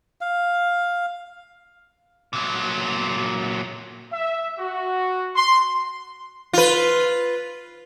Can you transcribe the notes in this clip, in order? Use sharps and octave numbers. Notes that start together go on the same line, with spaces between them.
F5
A#2 F#3
E5
F#4
C6
F4 B4